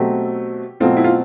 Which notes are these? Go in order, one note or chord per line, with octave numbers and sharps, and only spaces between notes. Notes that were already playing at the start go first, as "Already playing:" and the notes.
Already playing: B2 F#3 A3 C4 G4
B2 F#3 A3 C4 F4
E4
F4